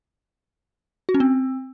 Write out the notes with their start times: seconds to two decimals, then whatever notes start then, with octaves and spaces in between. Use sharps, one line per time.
1.09 F#4
1.14 C#4
1.20 C4